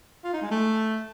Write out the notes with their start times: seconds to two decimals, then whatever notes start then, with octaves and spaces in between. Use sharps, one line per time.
0.24 F4
0.33 D#4
0.42 G#3
0.51 A3